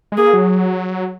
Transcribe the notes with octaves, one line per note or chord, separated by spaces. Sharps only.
G#3
A#3 G#4
F#3